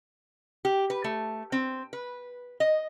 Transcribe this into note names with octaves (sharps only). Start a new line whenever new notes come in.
G4
B4
A3
C4
B4
D#5